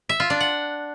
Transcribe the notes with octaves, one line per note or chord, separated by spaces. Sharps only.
E5
F4
D4
F#5